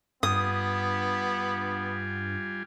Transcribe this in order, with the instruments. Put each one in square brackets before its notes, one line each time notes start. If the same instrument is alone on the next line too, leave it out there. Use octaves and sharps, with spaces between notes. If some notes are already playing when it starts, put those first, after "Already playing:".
[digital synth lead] G2 [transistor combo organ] G3 F4 G#5 [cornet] B3 [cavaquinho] D#6